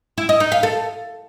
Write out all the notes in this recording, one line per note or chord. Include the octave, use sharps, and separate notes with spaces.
E4
D#5
D#4
F5
A4